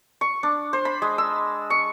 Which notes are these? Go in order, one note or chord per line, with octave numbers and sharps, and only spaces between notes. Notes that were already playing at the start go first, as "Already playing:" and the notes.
C#6
D4
C5
B5
G#3
E6
C#6